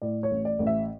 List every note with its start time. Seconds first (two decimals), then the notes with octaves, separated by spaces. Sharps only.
0.02 A2 D5
0.23 C#5
0.31 A1
0.45 D5
0.59 A1
0.67 E5